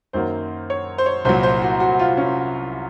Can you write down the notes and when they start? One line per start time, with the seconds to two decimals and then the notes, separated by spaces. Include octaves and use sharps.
0.13 F#2 D#3 F#3 A#3 C5
0.70 C#5
0.98 C5
1.06 C#5
1.25 C2 A#2 F#3 C5
1.43 C5
1.62 F#4
1.80 F#4
1.99 F4
2.17 C#4